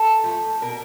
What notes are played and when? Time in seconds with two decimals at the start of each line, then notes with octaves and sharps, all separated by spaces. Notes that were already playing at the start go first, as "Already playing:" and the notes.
Already playing: A4
0.24 F3 A3
0.62 B2 A#4